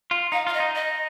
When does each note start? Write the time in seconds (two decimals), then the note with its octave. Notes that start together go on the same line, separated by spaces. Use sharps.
0.11 F4
0.32 D#4 F5
0.47 F4 F5
0.53 D#5
0.60 D#4
0.74 D#5